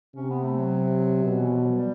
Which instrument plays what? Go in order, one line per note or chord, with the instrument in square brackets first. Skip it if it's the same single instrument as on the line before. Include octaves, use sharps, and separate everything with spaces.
[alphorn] C3 [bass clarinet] C#4
[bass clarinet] B3
A3
F#3
[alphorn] B2
[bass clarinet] E3
F3
F#3
G3